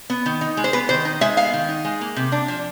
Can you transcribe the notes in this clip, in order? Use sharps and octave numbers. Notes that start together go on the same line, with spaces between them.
B3
D#3
D#4
G#3
C5
B3 B4
D#3 C5
D#4
G#3 E5
B3 F5
D#3
D#4
G#3
A#3
C3
D4
F3